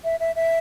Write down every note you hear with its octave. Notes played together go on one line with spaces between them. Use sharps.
E5
E5
E5